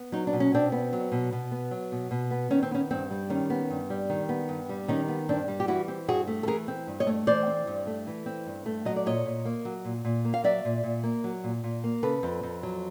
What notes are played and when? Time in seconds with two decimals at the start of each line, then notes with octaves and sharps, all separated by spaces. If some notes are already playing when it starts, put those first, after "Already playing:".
Already playing: B3
0.12 F#3 D#4
0.27 D4
0.33 B2
0.40 C#4
0.52 B2 C4 D4
0.72 B3
0.93 F#3
1.12 B2
1.33 B2
1.52 B3
1.71 F#3
1.92 B2
2.11 B2
2.31 B3
2.51 D#3 C#4
2.63 C4
2.71 B3 C#4
2.91 G2 C4
3.11 G3
3.30 D#3 C#4
3.50 B3
3.71 G2
3.90 G3
4.10 D#3
4.29 B3
4.49 G2
4.69 G3
4.88 D#3 C#4 D#4
5.08 B3
5.29 G2 C4 D4
5.48 G3
5.60 G4
5.68 E3 E4 F#4
5.88 C4
6.08 G2 F#4 G#4
6.27 A3
6.43 A4
6.47 E3 G#4 A#4
6.68 C4
6.87 G2
7.00 C#5 D#5
7.07 A3
7.27 E3 C5 D5
7.47 C4
7.67 G2
7.87 A3
8.07 E3
8.26 C4
8.46 G2
8.66 A3
8.85 F#3 D#5
8.96 D5
9.06 A#2 C#5 D#5
9.25 A#2
9.45 A#3
9.65 F#3
9.85 A#2
10.05 A#2
10.25 A#3
10.34 F5
10.44 F#3 D5 E5
10.65 A#2
10.84 A#2
11.04 A#3
11.24 F#3
11.44 A#2
11.64 A#2
11.84 A#3
12.03 C#3 A4 B4
12.23 F2
12.43 F2
12.63 F#3